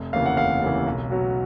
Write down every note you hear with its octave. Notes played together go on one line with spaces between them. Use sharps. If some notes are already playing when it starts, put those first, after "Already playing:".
Already playing: F1
D#2 C#3 E3 F5
F#5
F1 F5
D#2 C#3 E3
B1
B2 F#3